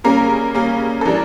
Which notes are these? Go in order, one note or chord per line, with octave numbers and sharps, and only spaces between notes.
C#3 G3 A#3 C#4 A#4
C#3 G3 A#3 C#4
A4
E3 G3 D4 A#4